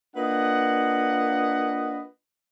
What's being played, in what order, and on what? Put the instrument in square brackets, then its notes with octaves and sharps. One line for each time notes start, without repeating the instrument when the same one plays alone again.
[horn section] A#3 D4 F4 B4 D#5 F#5